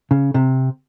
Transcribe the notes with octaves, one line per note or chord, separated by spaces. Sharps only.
C#3
C3